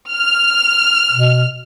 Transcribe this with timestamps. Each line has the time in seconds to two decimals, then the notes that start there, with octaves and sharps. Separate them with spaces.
0.11 F6
1.12 B2